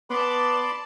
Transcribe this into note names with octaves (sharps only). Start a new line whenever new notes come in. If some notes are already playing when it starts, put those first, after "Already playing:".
B3 D5 A5 B5 C6 D6